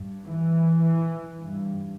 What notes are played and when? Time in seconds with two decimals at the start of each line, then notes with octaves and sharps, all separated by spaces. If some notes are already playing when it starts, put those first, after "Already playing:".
Already playing: G2
0.27 E3
1.42 G2